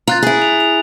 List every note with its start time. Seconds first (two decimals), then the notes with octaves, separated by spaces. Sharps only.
0.08 F4 A#5 F#6 A6
0.23 E4 G#4
0.42 F7
0.60 F7